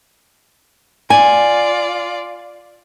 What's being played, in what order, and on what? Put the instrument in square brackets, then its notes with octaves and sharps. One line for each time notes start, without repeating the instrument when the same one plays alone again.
[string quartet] F4 D5 [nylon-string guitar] G#5